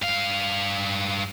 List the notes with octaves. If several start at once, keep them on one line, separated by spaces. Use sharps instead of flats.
G2 F5